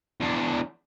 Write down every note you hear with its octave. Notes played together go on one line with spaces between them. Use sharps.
E2 D4